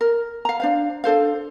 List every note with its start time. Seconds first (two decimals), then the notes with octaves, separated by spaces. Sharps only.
0.01 A#4
0.45 F5 A#5
0.60 D4 C5 F5
1.04 D4 A4 C5 F5